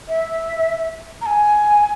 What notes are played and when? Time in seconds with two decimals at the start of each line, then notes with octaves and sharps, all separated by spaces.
0.08 E5
1.21 A#5
1.26 G#5